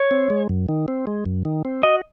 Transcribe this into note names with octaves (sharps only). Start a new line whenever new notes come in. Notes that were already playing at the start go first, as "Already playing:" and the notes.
Already playing: C#5
C4
G#3
F#2
D#3
C4
G#3
F#2
D#3
C4
F#4 D#5